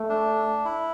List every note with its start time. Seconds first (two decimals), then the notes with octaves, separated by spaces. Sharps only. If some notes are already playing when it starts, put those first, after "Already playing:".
Already playing: A3
0.09 D4
0.65 E4